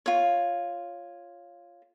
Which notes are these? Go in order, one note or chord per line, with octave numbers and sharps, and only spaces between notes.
F4 C#5